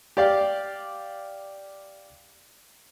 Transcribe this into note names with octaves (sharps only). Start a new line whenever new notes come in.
G4 D5 F5